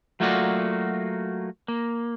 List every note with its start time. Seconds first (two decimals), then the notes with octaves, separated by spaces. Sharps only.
0.20 F#3 A3 A#3 F4 F#4 D5
1.68 A#3